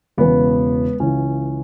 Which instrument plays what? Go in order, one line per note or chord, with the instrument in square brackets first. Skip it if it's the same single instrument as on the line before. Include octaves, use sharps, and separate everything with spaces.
[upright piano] E1 E2 C#3 B3
C#2 C#3 E3 C#4